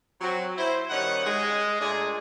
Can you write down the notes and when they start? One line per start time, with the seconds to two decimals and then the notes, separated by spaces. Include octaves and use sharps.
0.21 F#3 C4
0.57 E4 C5
0.90 D#3 G3 C#4 D#5 F#5
1.25 G#3
1.80 A#2 A3 D4 G#4